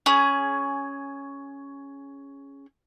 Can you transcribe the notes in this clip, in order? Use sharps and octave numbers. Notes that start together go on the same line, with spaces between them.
C#4 G#4